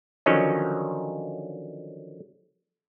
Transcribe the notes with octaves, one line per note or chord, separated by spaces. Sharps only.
D3 D#3 F3 F#3 C#4 D#4